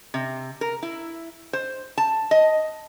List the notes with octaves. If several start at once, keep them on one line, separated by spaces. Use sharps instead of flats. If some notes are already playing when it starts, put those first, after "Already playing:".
C3
A#4
E4
C5
A5
D#5